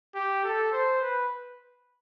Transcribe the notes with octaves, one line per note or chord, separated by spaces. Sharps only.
G4
A4
C5
B4